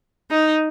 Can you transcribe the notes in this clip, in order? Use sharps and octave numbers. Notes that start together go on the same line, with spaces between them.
D#4